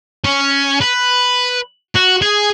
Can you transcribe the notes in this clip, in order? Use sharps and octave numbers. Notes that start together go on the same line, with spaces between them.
C#4
B4
F#4
G#4